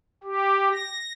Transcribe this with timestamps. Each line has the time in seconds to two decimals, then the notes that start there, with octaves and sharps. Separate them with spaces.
0.24 G4
0.73 A#6